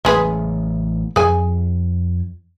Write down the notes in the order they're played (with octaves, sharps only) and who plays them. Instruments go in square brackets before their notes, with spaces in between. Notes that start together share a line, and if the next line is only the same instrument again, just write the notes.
[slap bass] A1 B3 [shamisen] G#3 G#4 B4
[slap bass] F2 [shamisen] G#4 G#5